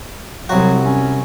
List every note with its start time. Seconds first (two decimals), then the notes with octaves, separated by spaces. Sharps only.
0.49 C2 F#3 F#4
0.85 C#4